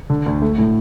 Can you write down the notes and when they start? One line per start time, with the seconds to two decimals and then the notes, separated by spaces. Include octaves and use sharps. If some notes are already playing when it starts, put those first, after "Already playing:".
0.10 D3
0.26 D2
0.42 A3
0.58 A2